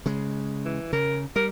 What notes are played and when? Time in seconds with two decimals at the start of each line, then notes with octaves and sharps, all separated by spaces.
0.06 C#3 G#3
0.65 E3
0.93 C#3 A#4
1.36 G3 A#4